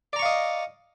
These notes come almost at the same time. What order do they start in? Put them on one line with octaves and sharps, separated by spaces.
D5 A#5 C#6 F5 D#5